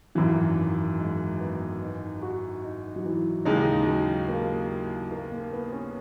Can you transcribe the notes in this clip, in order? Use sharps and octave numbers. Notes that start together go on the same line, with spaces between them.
G#1 F#2 E3 F#3
G#3
B3
D#4
F#4
D#4
F#3
E3
D#2 C#3 E3 G#3 D#4
F#3
A#3
A#3
A#3
B3
C#4